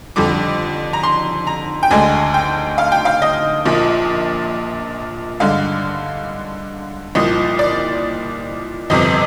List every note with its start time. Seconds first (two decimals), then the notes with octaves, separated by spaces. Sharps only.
0.16 F2 D3 G3 D6
0.93 A#5
1.03 C6
1.47 A#5
1.83 G5
1.91 D2 D3 G#3 G#5
2.34 G5
2.78 F5
2.92 G5
3.05 F5
3.22 D#5
3.65 A#1 A#2 F3
5.40 G2 D3 G#3 F5
7.15 C2 A#2 F3 D#5
7.59 D5
8.90 G1 F2 C3 D#5